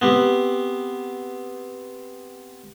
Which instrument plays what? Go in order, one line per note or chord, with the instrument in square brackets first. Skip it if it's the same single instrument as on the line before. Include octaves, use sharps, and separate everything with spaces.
[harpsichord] B3 C4 G4